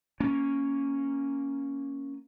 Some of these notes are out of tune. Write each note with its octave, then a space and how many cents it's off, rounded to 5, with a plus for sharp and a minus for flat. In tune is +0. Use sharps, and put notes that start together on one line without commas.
A#3 +0 C#4 +0